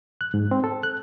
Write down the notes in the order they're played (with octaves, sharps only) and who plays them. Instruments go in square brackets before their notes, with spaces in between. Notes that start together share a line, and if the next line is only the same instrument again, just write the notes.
[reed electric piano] F#6
G#2
C4
A4
F#6